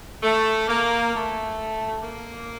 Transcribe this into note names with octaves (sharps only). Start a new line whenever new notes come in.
A3
A#3
A3
A#3